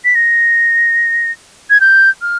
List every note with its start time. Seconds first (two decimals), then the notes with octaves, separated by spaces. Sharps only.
0.04 B6
0.15 A#6
1.70 G#6
1.80 G6
2.21 F6